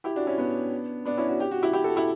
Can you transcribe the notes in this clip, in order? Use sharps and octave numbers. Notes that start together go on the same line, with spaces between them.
E4 G4
D4 F#4
C#4 E4
B3 D4
B3 D4
C#4 E4
D4 F#4
G4
F#4
E4 G4
E4 G4
F#4 A4
E4 G4